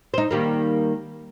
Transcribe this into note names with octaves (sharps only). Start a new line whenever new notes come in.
D#4 C5
D#3 G3 A#3